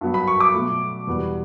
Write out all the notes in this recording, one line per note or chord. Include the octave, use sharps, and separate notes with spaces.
G2 F#3 B3
B5
C#6
D6
B2 F#3 A3
E2 B2 G3 B3